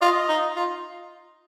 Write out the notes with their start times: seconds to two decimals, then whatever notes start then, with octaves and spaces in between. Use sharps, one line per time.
0.01 F4 D#5
0.29 D#4
0.56 F4